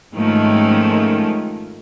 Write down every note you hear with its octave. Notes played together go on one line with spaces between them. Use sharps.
G#2 D#3 F3 A3 A#3 C#4